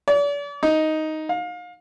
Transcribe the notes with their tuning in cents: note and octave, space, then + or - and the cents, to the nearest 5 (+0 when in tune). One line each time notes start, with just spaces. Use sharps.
D5 -40
D#4 +5
F5 +30